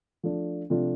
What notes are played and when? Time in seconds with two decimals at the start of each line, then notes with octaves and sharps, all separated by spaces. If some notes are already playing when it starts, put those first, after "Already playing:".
0.23 F3 A3 D4
0.70 C3 F3 A3 D4 F4